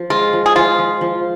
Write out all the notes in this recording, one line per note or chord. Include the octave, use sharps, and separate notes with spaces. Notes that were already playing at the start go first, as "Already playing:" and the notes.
Already playing: F3
G#3 F4
F3
G#4
F3 F4
F3
F3